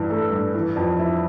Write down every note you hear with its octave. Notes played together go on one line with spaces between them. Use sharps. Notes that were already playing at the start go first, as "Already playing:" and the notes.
Already playing: G2 E3
A3
G2
E3
F2
E4